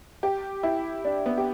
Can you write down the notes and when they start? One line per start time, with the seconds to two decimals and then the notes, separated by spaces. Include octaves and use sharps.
0.23 G4
0.63 E4
1.05 D4
1.26 B3
1.38 G4